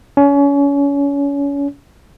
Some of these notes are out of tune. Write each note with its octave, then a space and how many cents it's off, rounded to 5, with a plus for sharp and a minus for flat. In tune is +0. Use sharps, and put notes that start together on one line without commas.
C#4 +30